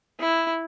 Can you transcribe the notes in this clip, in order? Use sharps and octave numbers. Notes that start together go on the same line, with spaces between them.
E4